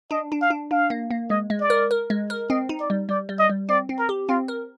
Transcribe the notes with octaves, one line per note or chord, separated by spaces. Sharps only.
D4 D#5
D4
F5
D4
D4 F5
A#3
A#3
G#3 D#5
G#3
D5
A#4
A#4
G#3
A#4
C4 D#5
D#4
D5
G3
G3 D5
G3
D#5
G3
C4 D5
C4
A#4
G4
C4 F4
A#4